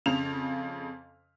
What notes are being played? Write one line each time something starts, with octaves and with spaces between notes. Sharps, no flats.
F2 C#3 F7